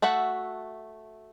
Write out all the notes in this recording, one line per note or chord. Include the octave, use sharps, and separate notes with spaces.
A3 F#4 E5 F#5